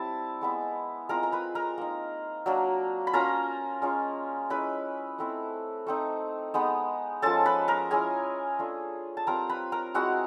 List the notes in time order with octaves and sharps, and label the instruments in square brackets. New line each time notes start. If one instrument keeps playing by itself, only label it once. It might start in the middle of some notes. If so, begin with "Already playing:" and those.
Already playing: [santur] G3 C4 E4 A5
G#3 B3 E4
G#3 C4 F4 A#4 A#5
A#5
B4 B5
A#4 A#5
A#3 D#4
F#3 A#3 D4
B5
A#3 C#4 F4 A#4 A#5
G#3 C#4 F4
G#3 C#4 E4 B4 B5
A3 C4 E4
A3 C4 D#4
G#3 B3 D#4
F3 G#3 C#4 A4 A5
B4 B5
A#4 A#5
G#3 C#4 E4 G#4 G#5
A3 D4 F4
A5
G3 C4 F4 A#4 A#5
B4 B5
A#4 A#5
G#3 C4 E4 F#4 F#5